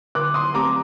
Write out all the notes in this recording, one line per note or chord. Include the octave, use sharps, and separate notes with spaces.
D3 D6 F#6
C6 D#6
A3 C4 G4 A#5 D6